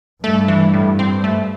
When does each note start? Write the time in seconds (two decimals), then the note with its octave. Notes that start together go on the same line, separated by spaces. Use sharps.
0.23 G2 A3
0.48 E3
0.74 A2
0.99 C4
1.24 A3